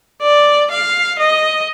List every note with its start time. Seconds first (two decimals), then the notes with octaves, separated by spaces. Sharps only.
0.22 D5
0.71 F5
1.19 D#5